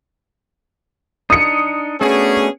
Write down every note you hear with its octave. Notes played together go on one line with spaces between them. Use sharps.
D4 D#4 D#6 C#7
A3 B3 C#4 D4 F#4 G#4